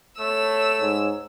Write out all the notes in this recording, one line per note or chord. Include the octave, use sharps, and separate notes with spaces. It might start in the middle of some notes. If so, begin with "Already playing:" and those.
A3 C#5 E6
G#2